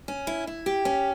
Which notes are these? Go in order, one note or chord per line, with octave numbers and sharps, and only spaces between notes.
C#4
E4
E4
G4
C#4